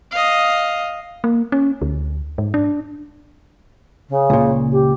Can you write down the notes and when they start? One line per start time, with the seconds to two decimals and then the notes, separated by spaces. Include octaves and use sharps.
0.11 D#5 F5
1.24 A#3
1.52 C#4
1.82 D2
2.38 G#2
2.54 D4
4.09 C#3
4.30 C#2 A#2
4.72 G4